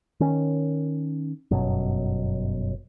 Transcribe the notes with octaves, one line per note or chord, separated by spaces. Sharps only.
D#3 C#4
G1 F#2 B2 F#3